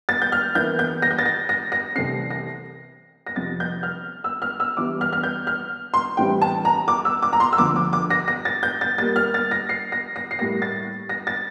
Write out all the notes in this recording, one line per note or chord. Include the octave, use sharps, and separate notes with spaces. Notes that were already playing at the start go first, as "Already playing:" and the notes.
A6
G6
F6
E2 E3 A#3 G6
G6
A#6
G6
A6
A#6
A#6
A#6
C2 C3 E3 A3 C4 C7
A#6
A#6
F2 C3 F3 C4 A6
G6
F6
E6
F6
E6
E2 E3 G3 D6
F6
F6
G6
F6
C6
A2 E3 G3 C4 G5
A5
A#5
D6
E6
D6
A#5
C6
E6
D2 D3 F3 D6
D6
D6
A#6
A#6
A6
G6
A6
A#2 G3 A#3 A6
F6
A6
A#6
C7
A#6
A#6
C7
A2 G3 A#3 A#6
A6
A#6
A6